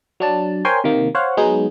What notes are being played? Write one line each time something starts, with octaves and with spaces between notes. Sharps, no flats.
F#3 D4 A5
A#4 C5 C#5 G5 G#5 C6
C3 D#3 A#3
C5 C#5 F5 F#5
F#3 G#3 B3 D#4 G#4